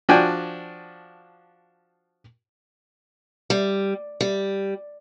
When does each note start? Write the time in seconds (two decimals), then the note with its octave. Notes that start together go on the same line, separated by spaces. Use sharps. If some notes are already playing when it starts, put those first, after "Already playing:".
0.09 F3 D4 F#4 G5 G#5
3.50 G3
4.21 G3